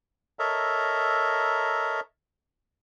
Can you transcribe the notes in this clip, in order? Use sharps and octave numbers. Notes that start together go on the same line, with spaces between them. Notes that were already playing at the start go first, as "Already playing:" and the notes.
A4 A#4 C#5 D#5 E5 A#5